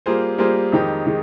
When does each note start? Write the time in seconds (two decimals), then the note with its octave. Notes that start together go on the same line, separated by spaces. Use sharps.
0.06 G3 A#3 F4 G#4 C5
0.38 G3 A#3 F4 G#4 C5
0.72 F2 D#3 G#3 D#4 G4
1.06 D#3 G#3